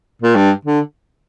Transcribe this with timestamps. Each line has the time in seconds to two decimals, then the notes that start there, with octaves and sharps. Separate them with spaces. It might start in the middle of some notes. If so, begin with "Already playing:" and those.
0.22 A#2
0.35 G2
0.65 D3